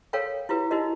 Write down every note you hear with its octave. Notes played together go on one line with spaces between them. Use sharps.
A4 A#4 C#5 F5 G5
E4 F4 G4 B4
D#4 E4 F#4 G4 A#4 D#5